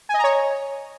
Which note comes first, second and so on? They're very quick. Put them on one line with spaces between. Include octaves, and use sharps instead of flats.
G#5 D#5 A#5 C#5